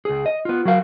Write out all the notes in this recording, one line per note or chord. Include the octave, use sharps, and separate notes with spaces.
C#2 G#4
D#5
B3 F4
F#3 F#4 A#4 F5